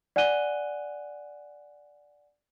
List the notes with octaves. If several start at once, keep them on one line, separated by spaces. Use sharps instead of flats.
D5 F#5 G#5 F#6 D#7 G7